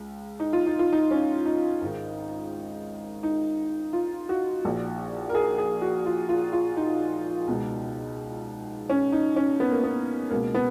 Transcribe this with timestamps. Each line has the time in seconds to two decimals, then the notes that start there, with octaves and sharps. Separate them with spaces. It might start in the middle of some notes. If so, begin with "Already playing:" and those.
Already playing: C#2
0.40 D#4
0.53 F4
0.66 D#4
0.79 F4
0.93 D#4
1.11 C#4
1.46 D#4
1.82 G#1 G#2 D#3
3.23 D#4
3.93 F4
4.29 F#4
4.64 A#1 A#2
5.29 A#4
5.35 G#4
5.58 G#4
5.82 F#4
6.06 F4
6.29 F4
6.53 F4
6.77 D#4
7.47 C#2 B2
8.90 C#4
9.12 D#4
9.36 C#4
9.60 B3
9.72 A#3
9.83 B3
10.30 C#2 B2 A#3
10.54 B3